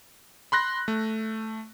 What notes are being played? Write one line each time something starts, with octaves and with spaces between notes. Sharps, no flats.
B5 C6 F#6 A#6
A3